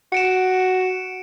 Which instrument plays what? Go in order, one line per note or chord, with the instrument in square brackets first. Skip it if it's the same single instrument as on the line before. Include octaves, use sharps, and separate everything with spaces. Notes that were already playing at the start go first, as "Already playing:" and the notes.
[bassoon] F#4 [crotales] C#7 D7 E7